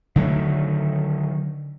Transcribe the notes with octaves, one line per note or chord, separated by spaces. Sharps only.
D3 D#3 F#3 A3